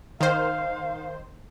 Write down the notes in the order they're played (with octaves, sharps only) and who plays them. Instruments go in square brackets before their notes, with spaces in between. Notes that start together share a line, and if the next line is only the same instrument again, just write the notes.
[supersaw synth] D#3 C5 [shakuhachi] F5